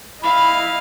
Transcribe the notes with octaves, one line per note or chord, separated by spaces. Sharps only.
E4 D#5 F5 B5